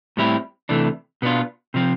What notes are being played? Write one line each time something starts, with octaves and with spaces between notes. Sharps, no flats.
A2 G3 C4 E4
C3 E3 A3 D4
B2 B3 D4 F4
C3 F3 C4